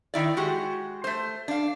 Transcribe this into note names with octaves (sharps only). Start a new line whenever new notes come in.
D#3 E4 D5
G#3 F#4 G4
A3 C5
D4 F5